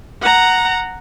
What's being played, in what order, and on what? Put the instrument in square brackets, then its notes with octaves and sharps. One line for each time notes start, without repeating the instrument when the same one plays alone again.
[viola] F#5 A#5